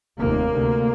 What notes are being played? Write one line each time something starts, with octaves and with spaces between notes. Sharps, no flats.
F1 D#2 A#3
D2 C3